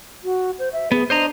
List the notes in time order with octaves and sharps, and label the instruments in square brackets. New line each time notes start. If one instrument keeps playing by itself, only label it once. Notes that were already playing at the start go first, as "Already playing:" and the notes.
[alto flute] F#4
C5
E5
[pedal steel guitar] B3 [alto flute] G#4
[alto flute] D4 [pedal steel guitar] C5 D#5 A#5